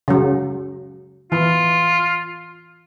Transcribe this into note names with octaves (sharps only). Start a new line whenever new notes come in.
C#3 F#3
E3 F4